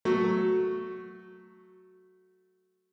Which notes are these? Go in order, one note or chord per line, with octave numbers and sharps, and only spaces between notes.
F#3 A3 F#4